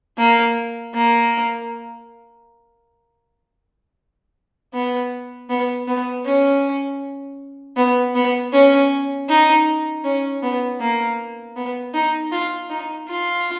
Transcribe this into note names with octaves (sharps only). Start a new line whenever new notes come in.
A#3
A#3
B3
B3
B3
C#4
B3
B3
C#4
D#4
C#4
B3
A#3
B3
D#4
F4
D#4
F4